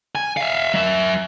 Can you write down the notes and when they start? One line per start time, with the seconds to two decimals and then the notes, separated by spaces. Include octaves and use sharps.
0.15 G#5
0.37 E5 F5
0.74 F#3 E5